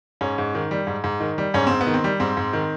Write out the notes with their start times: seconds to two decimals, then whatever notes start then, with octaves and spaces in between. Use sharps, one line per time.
0.21 G#2 C#4
0.38 G#2
0.55 D#3
0.71 G3
0.87 G#2
1.04 G#2
1.20 D#3
1.38 G3
1.54 G#2 C#4
1.67 G#2 C4
1.81 B3
1.87 D#3
1.94 C4
2.04 G3
2.20 G#2 C4
2.37 G#2
2.53 D#3